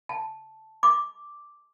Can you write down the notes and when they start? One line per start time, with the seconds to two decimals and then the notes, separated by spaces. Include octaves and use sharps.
0.09 A5
0.83 D6